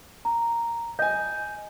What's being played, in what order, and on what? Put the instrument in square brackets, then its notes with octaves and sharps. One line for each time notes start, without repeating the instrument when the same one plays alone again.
[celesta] A#5
[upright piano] D#5 G#5 [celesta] G6